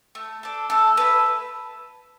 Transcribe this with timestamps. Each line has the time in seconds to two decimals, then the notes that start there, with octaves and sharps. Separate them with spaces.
0.15 A3
0.43 D4 A4
0.70 A3 A4
0.97 E4 A4 B4